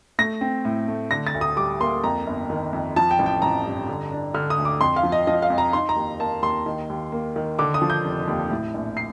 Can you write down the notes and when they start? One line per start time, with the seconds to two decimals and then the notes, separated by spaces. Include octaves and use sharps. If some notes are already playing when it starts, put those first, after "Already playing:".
0.18 A3 A#6
0.41 C4
0.65 A2
0.88 A3
1.11 D3 A#6
1.27 A6
1.34 D2
1.41 D#6
1.56 G3 D6
1.80 A#3 C6
2.04 F2 A#5
2.27 G1
2.50 D#3
2.73 F2
2.96 F3 A5
3.11 G5
3.19 A1
3.26 G5
3.42 A1 A#5
3.66 G2
3.89 D3
4.11 D4
4.34 D3 F6
4.50 D#6
4.58 D2
4.65 D6
4.81 F2 C6
4.96 F5
5.03 F3
5.12 D#5
5.27 F3 D#5
5.42 F5
5.50 F2
5.58 A#5
5.73 D#4 C6
5.89 A#5
5.96 D#2
6.20 A#3 A5
6.42 D#2 C6
6.66 D#3
6.90 D#2
7.12 A#3
7.36 D#3
7.59 D3 D6
7.74 D#6
7.82 F3
7.90 G6
8.05 F1
8.28 D#2
8.50 A2
8.74 A#1
8.97 C7